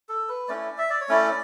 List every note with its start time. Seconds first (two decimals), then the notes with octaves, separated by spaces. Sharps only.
0.09 A4
0.29 B4
0.48 A3 C#4 E4 D5
0.78 E5
0.90 D5
1.01 C#5
1.09 A3 C#4 E4 D5